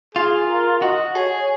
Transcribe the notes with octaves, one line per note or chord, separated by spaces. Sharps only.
F4 G#4
A#4
F#4 D#5
G#4 C#5